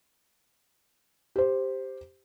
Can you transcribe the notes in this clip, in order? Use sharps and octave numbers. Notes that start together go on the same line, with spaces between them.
G4 C5